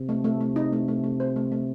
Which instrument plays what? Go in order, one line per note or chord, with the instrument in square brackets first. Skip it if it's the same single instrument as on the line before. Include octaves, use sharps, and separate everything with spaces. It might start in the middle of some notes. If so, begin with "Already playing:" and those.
Already playing: [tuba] C3
[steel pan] A3
A3
A3
D#4
A3
A3
A3
C5
A3
A3